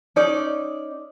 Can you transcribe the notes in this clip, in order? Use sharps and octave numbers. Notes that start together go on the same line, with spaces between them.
C#4 D#4 D5